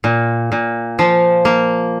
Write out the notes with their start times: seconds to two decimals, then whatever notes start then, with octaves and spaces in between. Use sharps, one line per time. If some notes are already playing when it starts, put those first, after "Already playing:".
0.04 A#2
0.52 A#2
0.99 F3
1.45 A#3